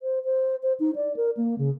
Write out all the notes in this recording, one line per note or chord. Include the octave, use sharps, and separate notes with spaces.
C5
C5
C5
D#4
D5
A#4
A#3
C#3